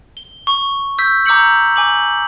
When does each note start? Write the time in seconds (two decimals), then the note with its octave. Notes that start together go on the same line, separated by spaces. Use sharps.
0.17 G7
0.47 C#6
0.99 E6 G6 B6
1.26 A#5 D6 E6 G6 C#7 F#7
1.76 G#5 D6 F#7